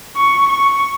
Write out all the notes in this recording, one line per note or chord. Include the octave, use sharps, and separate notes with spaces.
C#6
C#6